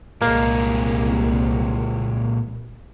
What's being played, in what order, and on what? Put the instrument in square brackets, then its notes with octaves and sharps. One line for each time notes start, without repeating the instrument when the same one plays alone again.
[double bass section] C2 [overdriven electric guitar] A#2 G#3 [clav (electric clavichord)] A#3